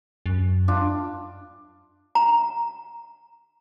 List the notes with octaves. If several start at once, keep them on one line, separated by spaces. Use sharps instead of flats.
F#2
D4 F4
A#5